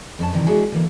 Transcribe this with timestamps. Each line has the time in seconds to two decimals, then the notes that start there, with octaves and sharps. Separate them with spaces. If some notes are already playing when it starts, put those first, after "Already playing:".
0.19 F2 C#4 A5
0.33 G2 C3 D#3 E3
0.46 G#3 D4 E4 F#4 G#4
0.72 D3 E3 A#3